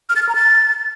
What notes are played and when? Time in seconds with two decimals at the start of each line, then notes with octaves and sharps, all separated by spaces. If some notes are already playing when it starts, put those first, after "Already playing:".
0.09 F6
0.16 A6
0.22 F6
0.29 A#5
0.35 A6